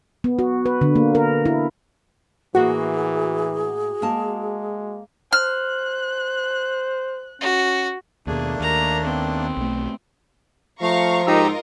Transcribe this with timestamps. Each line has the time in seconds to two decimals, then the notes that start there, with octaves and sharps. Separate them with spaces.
0.24 B3
0.39 F#4
0.66 B4
0.81 D3
0.96 A#3
1.15 A#4
1.46 E4
2.55 A2 E3 A#3 F#4 G#4
4.02 G#3 A#3 A5
5.33 C5 F6 F#6
7.41 C#4 F#4
8.27 D#2 B2 A3 A#3 D4 G#4
8.60 D#2 A#4 A#5
9.05 B3 C4
9.57 B1 A3
10.82 F3 A3 F5 A#5 C#6
11.27 G#2 D#4 F4 G4 A#4 D#5 A#5 E6